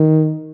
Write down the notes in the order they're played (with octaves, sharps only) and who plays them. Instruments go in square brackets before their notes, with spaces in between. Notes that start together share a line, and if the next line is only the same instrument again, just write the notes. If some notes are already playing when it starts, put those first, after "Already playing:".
Already playing: [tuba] D#3